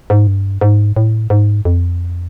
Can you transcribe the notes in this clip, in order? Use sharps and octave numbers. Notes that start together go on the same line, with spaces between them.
G#2
G2
G#2
A2
G#2
F2